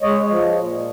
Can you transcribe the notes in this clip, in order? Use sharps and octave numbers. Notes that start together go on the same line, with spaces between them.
G#3 C#5 D#5
F3
A#2